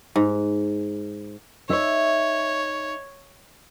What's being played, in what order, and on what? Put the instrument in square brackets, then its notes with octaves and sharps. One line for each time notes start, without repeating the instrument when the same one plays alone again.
[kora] G#2
[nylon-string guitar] D#4 E5 [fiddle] C#5